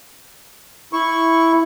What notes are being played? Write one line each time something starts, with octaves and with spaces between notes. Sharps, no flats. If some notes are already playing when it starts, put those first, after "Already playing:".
E4 C#6